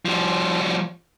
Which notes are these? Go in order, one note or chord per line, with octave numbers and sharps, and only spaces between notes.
F3 G3